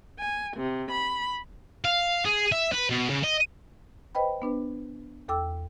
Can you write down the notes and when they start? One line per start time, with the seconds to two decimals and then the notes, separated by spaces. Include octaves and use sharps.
0.18 G#5
0.56 C3
0.90 B5
1.85 F5
2.25 G#4
2.52 E5
2.73 B4
2.90 B2
3.10 C#3
3.24 D#5
4.15 B4 C5 D#5 G5 B5
4.42 B3 D4 B4
5.28 E2 A4 G5 D6 E6